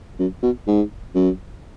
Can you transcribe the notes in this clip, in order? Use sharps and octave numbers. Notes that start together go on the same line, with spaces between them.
F#2
B2
G#2
F#2